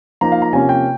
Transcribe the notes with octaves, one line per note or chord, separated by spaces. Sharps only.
F3 A#3 D#4 A#5
F5
A#5
C3 F3 A#3 C#4 G#5
G5